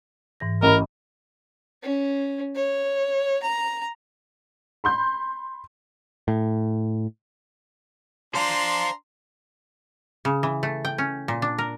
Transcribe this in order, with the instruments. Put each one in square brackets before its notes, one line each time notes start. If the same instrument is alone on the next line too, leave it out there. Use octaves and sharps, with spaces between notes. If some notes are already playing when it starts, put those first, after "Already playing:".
[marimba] G#2 E3 A#6
[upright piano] A1 [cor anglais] A#4 [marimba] D#5 A#5 B5
[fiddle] C#4
C#5
A#5
[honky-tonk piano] B5 C6 G6
[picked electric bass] A2
[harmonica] D4 A#5 C6 [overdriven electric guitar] C5 F5
[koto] C#3
E3
A3
G5
C#4
A#2
D4
A#4